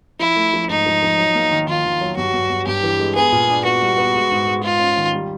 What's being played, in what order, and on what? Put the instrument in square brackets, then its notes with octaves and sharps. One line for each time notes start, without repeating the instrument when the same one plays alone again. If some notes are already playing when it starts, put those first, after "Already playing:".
[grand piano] F3 [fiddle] E4
[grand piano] A3
F3
[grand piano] G#2 [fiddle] D#4
[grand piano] F3
F3
F#3
A#3
D#3
[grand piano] D#3 [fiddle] F4
[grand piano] D#3
F#3
[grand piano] G2 [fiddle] F#4
[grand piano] G2
G2
[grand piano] G2 [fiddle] G4
[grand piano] E3
G#3
[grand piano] B3 [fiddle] G#4
[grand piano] A#2
D4
[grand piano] B3 [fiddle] F#4
[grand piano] G3
B3
G#3
G#2
G#3
[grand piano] G#3 [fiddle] F4
[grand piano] C#4
D#3
G3